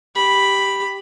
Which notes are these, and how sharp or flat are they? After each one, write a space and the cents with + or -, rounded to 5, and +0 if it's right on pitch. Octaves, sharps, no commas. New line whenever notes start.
G4 +0 B5 +0